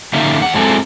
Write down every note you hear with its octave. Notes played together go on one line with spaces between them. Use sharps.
D3 A#3 C#4 D#4 E5
E2 F#5
F#3 G#3 C4 E4 G#4 A4